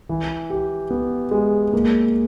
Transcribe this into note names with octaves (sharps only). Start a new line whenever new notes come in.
E3
G4
B3
G#3
A#3